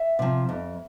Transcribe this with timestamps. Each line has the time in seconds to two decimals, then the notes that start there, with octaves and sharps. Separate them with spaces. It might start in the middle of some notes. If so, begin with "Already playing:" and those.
Already playing: E5
0.19 C3 F3
0.49 F2